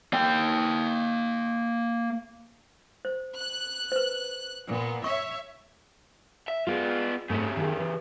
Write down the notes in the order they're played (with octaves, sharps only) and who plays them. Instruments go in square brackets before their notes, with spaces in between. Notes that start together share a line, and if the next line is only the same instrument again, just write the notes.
[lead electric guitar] A#3 G5
[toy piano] C5
[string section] F#6
[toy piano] B4 C5
[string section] A#2 B3
[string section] C#5 E5 [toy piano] C#6
[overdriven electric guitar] E5
[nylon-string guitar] G#3 [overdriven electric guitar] B3 F4
[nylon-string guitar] G#2 A3 C4 [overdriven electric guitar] C#3 G4
[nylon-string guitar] D#3 G#4 F5
E3